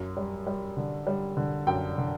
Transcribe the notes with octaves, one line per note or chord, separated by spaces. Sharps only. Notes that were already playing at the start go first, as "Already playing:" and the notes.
Already playing: F#2
G3
G3
D3
G3
D3
F#2 G5
D3